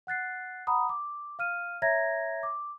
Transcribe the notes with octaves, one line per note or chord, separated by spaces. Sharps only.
F#5 F#6 A6 C7
F#5 A#5 B5 D#6
D6
F5 F6 D#7
C#5 E5 A#5 G#6 A#6
D6